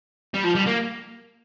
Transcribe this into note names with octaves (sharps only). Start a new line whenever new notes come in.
G3
F3
G3
A#3